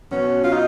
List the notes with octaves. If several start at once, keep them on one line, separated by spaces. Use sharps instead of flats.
B2 F#3 B3 C#4 F#4
F4
D#4